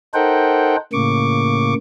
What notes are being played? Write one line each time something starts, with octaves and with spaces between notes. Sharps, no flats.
D#4 A4 A#4 C5 F#5 G5
A2 C#3 A#3 C#6 D6